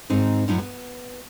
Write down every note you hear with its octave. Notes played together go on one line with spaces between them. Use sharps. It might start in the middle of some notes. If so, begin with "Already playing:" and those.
G#2 D#3 C4 D#4
F#2 A2 F3 F#3 D#4 E4
B3